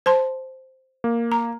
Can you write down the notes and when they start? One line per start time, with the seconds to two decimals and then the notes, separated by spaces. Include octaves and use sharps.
0.06 C5 A5 C6
1.04 A#3
1.32 A#5